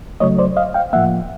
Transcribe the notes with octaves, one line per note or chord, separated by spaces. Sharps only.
C#3 F#3 A3 C#5 D#5
C5 D5
D#5 F5
F5 G5
A2 F3 A#3 E5 F#5